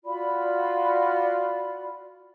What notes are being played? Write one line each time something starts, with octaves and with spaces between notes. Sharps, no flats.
F4 F#4 D5 B5